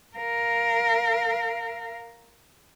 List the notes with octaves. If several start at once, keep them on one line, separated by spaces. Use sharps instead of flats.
A#4 F5